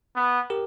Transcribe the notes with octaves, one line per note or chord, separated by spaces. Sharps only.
B3
G4 A#4